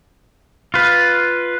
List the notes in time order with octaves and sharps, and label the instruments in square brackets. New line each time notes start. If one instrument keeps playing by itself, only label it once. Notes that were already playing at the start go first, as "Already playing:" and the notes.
[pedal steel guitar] F4 B4